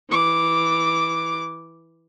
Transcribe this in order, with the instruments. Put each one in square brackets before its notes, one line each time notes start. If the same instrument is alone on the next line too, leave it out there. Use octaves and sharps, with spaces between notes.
[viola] E3 D6